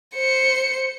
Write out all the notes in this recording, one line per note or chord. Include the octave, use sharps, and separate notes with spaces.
C5 C#7